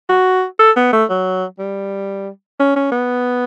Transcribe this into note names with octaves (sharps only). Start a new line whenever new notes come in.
F#4
A4
B3
A3
F#3
G3
C#4
C#4
B3